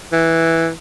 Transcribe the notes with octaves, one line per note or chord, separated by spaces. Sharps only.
E3